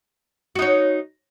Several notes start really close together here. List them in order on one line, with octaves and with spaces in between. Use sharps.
F#4 D#4 C#5